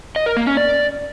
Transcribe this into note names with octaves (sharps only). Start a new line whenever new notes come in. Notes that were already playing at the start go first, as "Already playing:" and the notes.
D#5
A#4
A#3
C#4
D5